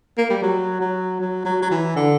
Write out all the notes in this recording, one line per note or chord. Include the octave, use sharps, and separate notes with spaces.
A#3
G3
F#3
F#3
F#3
F#3
F#3
E3
D3